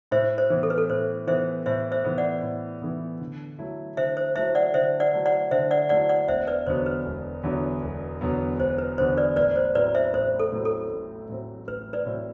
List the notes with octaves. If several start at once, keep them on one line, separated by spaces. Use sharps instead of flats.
A2 C5 E5
C5
E3 B3
A4
B4
A4
A2 C5
E3 B3 C5 E5
A2 C5 E5
C5 E5
E3 B3
D5 F#5
A2
E3 B3
D3
F#3 A3 E4
D3 C5 E5
C5
F#3 A3 E4 C5 E5
D5 F#5
D3 C5 E5
D5 F#5
F#3 A3 E4
D5 F#5
D3 C5 E5
D5 F#5
F#3 A3 E4 D5 F#5
D5 F#5
E1 C5 E5
B4 D5
E2 D3 F#3 B3 C5
B4
E1
E2 D3 F#3 B3
E1
E2 D3 F#3 B3
E1 C5
B4
E2 D3 F#3 B3 C5
B4 D5
A1 B4 D5
C5
A2 F#3 C4 B4 D5
C5 E5
A1 C5
A4
A2 F#3 C4
A4
A1
A2 F#3 C4
A1 B4
B4 D5
A2 F#3 C4